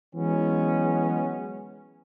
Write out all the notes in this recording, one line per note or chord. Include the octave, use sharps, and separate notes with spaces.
E3 F#3 G#3 B3 C#4